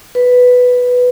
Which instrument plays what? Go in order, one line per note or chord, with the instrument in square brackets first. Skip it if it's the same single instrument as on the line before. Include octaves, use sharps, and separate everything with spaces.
[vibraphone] B4